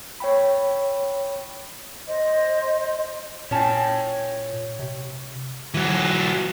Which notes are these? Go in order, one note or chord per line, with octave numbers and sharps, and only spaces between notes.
C#5 G5 B5
C5 D#5 C6
A#2 C#4 C#5 G5 A5
C3
E3 F#3